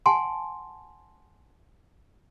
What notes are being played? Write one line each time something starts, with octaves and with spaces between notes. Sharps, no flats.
F#5 G#5 A5 C6